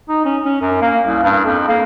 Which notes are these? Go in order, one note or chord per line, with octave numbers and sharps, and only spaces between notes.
D#4
C#4
C#4
F#2
A#3
C2
G2
F2
A#3